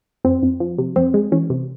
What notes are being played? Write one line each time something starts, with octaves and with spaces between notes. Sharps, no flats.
F2 C4
F2
F3
C3
F2 C4
G#3
E3 C#4
C3